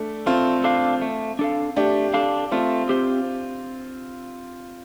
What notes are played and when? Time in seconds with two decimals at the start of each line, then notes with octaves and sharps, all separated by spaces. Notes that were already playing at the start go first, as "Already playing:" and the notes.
Already playing: A3 D4
0.26 A3 C4 F4
0.64 D4 A4 F5
1.02 A3
1.39 D4 A4 F5
1.76 A3 D4 G4
2.14 D4 A4 F5
2.51 A3 C4 F4
2.89 C4 G4 C5